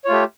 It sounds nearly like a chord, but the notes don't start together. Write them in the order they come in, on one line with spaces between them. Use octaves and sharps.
C#5 F4 A3 G4